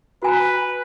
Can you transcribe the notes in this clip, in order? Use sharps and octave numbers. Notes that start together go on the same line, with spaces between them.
F#4 B4 G#5 A#5